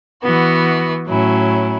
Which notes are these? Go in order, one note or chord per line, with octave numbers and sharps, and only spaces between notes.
E3 B3 F#4
A2 F#3 C#4 E4